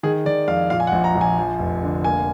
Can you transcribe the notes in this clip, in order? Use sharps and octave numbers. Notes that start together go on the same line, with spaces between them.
D#3 G#4
D#3 D5
F2 F5
A#2 F5
G#5
F#5
A#1
A#5
A#1
G#5
F3
F1
D3
A#3 G#5